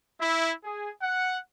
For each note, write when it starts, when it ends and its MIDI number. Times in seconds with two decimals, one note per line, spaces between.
0.20 0.51 64
0.64 0.90 68
1.02 1.37 78